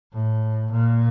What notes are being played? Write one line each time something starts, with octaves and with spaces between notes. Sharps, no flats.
A2
A#2